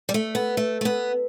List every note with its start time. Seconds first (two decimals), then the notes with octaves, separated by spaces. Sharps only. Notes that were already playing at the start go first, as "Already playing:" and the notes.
0.09 G3
0.14 A3
0.35 B3
0.57 A3
0.81 A3
0.85 B3